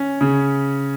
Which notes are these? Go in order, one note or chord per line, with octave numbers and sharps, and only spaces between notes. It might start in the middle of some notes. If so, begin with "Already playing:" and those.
Already playing: C#4
C#3